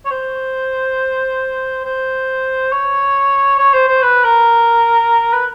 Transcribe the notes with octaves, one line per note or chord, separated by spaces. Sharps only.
C#5
C5
C5
C#5
C#5
C5
C5
B4
A#4
B4